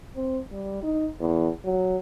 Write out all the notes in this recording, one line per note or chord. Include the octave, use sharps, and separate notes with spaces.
C4
G3
D#4
E2
F#3